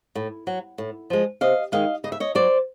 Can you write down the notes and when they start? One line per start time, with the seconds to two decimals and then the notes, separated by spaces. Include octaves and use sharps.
0.15 A2
0.47 F#3
0.78 A2
1.10 F3 G#3
1.41 C3 D#5 F5
1.72 D#3 G#3 D#5 F5
2.04 C#3 D#5
2.12 E5
2.20 C#5 D#5
2.35 F#3 C5 D5